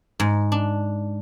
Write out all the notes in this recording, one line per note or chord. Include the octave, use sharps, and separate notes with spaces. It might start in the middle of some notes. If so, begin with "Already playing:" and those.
G#2
D4